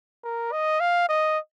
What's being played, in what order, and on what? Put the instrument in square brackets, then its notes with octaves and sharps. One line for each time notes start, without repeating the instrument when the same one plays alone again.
[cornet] A#4
D#5
F5
D#5